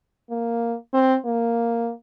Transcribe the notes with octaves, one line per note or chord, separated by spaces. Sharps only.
A#3
C4
A#3